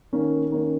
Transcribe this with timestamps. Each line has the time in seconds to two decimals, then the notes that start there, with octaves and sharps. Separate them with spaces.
0.13 D#3 A#3 C#4
0.50 D#3 A#3 C#4